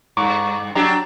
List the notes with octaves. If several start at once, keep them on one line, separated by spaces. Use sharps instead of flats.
G2 A#5 C#6 D6
F#3 D4 G4 A#5